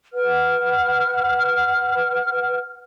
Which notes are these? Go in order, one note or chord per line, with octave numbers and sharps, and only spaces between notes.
B4 F#5 F6